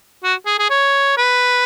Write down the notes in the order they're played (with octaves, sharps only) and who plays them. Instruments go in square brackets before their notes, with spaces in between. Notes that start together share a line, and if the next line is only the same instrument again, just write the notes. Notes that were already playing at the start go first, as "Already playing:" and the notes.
[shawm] F#4
G#4
G#4
C#5
B4